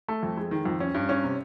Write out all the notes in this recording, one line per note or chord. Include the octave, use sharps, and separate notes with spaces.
A3
F2
G#3
D#3
F2
C#4
G2
C#4
C3